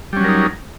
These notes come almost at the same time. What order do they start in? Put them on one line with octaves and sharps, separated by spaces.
G3 C#4 F#3 A#4 D#4